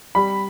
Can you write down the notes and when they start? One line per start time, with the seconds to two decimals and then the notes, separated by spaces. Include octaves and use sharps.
0.15 G3 B5